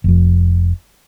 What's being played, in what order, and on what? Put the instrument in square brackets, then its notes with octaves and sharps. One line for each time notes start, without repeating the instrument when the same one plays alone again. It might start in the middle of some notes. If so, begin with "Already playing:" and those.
[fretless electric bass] F1 F2